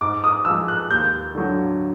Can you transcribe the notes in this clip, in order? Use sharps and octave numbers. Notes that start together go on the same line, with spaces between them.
G#2 D6
D#6
F3 G#3 E6
F#6
D#2 G6
D3 F#3